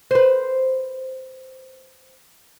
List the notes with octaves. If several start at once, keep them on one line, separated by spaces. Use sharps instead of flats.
B4 C5